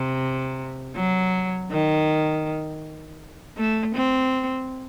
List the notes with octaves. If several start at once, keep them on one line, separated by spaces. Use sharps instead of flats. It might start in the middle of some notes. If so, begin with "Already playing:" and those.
Already playing: C3
F#3
D#3
A3
C4